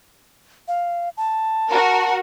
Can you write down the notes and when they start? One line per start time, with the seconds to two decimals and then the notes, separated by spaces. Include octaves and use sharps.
0.68 F5
1.17 A5
1.69 F#4 A#4